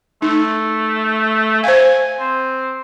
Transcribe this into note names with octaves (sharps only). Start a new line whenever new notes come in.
A3 D#4
C5 F5 G#5
C4